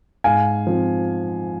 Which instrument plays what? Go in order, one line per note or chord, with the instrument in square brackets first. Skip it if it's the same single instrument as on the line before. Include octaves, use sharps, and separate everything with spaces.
[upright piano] G#2 F5 G#5
F3 C4